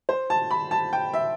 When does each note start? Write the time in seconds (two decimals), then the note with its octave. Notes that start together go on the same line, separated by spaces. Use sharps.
0.09 C5
0.30 A5
0.51 B5
0.71 A5
0.93 G5
1.14 E5